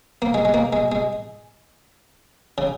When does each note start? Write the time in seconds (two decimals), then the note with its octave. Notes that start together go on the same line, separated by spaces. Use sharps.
0.22 A#3
0.34 G#3
0.45 G#3
0.54 A#3
0.73 G#3
0.92 G#3
2.58 C#3